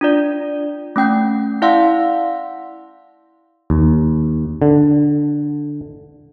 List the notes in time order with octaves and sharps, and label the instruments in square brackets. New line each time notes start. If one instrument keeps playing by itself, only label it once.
[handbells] D4 F4 D5
A3 C#4 G5 G6
E4 D5 F5 F#5 C6 E6
[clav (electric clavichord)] D#2
D3